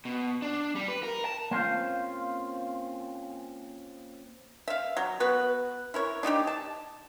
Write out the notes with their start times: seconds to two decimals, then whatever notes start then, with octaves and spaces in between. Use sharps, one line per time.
0.05 B2
0.42 D4
0.75 G3
0.88 B4
1.03 A#4
1.25 A5
1.51 A#3 C4 C#4 F4 C5 F5
4.68 E5 F5
4.97 F#3
5.20 B3 F#4 B4
5.94 E4 A#4 C#5
6.23 D4 D#4 F#4 G4
6.47 A5